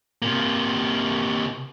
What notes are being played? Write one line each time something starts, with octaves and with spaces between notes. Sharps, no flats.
C3 A#3